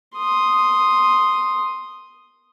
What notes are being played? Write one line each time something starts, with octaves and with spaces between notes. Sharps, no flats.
C6 D#6